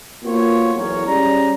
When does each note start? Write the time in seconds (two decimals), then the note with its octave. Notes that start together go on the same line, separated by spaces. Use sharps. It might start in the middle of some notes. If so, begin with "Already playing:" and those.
0.25 A#3 B3 F4 F#4 C5 C#5
0.75 B1 E2 E4 G#4 A#4 C#5
1.05 G3 G#3 C#4 D5 A#5